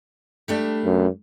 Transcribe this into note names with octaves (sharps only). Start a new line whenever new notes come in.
G3 A3 D4
F#2